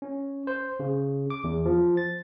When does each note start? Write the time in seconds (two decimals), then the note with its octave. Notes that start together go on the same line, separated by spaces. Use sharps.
0.02 C#4
0.47 C5
0.80 C#3
1.30 D6
1.44 E2
1.65 F3
1.97 A6